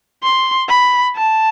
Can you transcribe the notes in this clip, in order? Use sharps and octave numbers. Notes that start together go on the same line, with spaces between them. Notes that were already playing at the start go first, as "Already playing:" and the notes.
C6
B5
A5